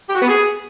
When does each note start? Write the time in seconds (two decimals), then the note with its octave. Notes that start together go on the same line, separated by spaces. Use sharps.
0.09 G4
0.15 F#4
0.21 B3
0.28 G#4